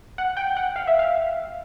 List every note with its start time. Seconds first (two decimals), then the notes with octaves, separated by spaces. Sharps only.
0.18 F#5
0.37 G5
0.57 F#5
0.76 F5
0.87 E5
0.99 F5